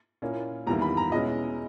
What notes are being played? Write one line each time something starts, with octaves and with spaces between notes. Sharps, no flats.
A#2 A#3 C#4 E4
E2 D#3 G3 A#3 E4 A#5
B5
A#5
B2 G#3 C#4 E4 D#5